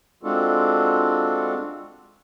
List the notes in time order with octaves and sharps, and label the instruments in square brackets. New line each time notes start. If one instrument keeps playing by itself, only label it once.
[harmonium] G#3 C4 D4 F4 F#4 A4